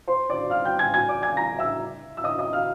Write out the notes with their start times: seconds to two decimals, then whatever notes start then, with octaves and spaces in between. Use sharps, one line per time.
0.08 C5 C6
0.30 D5 D6
0.50 F5 F6
0.65 G5 G6
0.79 G#5 G#6
0.94 G#5 G#6
1.08 D5 D6
1.22 G#5 G#6
1.37 A#5 A#6
1.59 E5 E6
2.17 E6
2.24 D#5 D#6
2.39 D#5 D#6
2.53 F5 F6